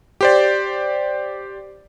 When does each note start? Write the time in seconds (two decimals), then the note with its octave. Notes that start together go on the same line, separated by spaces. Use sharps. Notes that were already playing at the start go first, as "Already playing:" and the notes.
0.21 G4 C5 D5